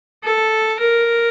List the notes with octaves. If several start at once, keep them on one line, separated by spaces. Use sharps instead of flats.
A4
A#4